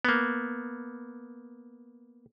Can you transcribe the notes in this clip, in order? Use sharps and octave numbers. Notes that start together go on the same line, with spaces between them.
A#3 B3